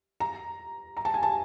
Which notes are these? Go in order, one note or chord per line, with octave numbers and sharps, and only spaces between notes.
A#5
A#5
A5
G#5
A5